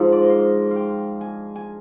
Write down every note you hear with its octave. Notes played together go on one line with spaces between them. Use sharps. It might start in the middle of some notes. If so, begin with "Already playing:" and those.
Already playing: G#2 F3
D5
D#5
F5
F5 G5
G#5
G#5